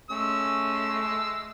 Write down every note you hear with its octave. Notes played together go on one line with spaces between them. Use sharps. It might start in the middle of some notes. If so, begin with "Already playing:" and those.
G#3 A3 C#4 E6